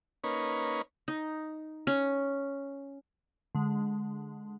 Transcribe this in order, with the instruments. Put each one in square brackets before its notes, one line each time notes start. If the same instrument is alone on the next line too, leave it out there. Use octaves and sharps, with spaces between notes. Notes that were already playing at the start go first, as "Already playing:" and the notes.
[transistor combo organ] A#3 C#4 D#4 B4 C#5
[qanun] D#4
C#4
[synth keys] D3 G#3